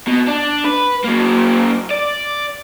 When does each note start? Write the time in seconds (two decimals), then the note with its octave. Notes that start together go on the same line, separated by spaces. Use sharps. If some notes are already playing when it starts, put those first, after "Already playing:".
0.07 B2
0.27 D4
0.65 B4
1.05 F#3 A#3
1.91 D5